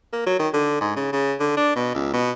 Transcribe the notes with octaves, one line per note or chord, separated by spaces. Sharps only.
A#3
F#3
D#3
D3
G#2
C#3
C#3
D3
D4
B2
C#2
B2